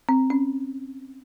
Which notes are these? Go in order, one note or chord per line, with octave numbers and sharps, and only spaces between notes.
C4
C#4